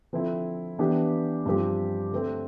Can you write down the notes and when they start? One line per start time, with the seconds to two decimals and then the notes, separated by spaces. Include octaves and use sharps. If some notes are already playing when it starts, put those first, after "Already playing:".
0.13 D3 F3 C4 E4
0.79 E3 B3 D4 G4
1.46 G2 F3 C4 G4
2.11 D3 A3 C4